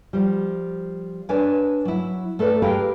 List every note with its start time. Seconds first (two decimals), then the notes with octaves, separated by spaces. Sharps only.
0.13 F3 G3
1.29 D4 A#4 B4 C#5 D5 G#5
1.85 F#3 E4
2.39 A3 A4 B4 D5
2.62 G4 G#4 A#4 B4 F5 G5